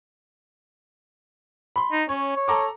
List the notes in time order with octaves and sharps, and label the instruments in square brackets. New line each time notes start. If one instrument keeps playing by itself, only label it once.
[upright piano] B5 C6
[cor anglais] D#4
[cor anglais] C#4 [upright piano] C#5
[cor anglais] C#5
[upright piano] A4 A#5 D6